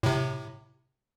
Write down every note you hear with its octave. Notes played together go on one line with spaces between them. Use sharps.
A2 C3